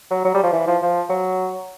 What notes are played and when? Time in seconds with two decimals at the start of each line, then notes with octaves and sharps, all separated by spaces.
0.11 F#3
0.24 F#3
0.34 G3
0.43 F3
0.53 E3
0.67 F3
0.82 F3
1.09 F#3